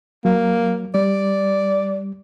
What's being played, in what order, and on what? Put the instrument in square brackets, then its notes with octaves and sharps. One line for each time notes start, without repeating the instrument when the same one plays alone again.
[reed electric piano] F#3 [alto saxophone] A#3
[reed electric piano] G3 [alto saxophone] D5